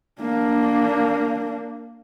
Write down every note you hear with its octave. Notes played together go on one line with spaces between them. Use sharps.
A#3 D4